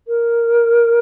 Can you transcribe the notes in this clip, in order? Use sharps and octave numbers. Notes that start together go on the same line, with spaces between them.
A#4